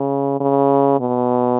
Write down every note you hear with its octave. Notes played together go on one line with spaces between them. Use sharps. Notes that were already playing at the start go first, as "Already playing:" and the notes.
Already playing: C#3
C#3
B2